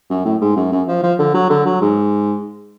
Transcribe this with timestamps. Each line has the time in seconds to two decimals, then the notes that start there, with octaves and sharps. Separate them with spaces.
0.10 F#2
0.25 A2
0.41 G#2
0.57 F#2
0.72 F#2
0.88 F3
1.03 F3
1.19 D3
1.34 F#3
1.50 D3
1.66 F#3
1.81 G#2